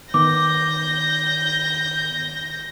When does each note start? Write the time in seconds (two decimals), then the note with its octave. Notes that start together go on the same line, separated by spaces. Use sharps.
0.14 D#3 B3 D6 G6 A#6